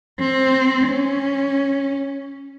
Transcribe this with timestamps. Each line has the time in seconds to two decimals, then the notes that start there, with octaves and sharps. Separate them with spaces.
0.20 C4
0.88 C#4